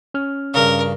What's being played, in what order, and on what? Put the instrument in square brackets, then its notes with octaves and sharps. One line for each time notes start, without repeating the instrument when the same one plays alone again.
[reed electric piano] C#4 F6
[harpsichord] G2 C#3 [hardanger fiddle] A#4